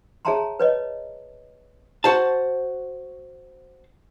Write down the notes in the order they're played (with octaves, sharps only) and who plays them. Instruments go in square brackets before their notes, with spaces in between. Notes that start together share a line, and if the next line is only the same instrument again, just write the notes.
[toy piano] G#4 C#5 E5 A5 A#5 C6
B4 C#5 D#5
[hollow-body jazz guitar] F#4 C5 A5